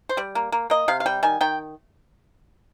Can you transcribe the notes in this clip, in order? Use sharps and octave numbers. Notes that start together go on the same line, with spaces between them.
C5
G3 D5
A#3
A#3
A#3 D#5
C3 F5
F5
G3 G5
D#3 G#5
D#3 G5